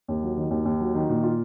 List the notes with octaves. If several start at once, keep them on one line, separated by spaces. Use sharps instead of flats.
D#2
F#3
D#3
D#2
D#2
F#3
D#3
A#2
F4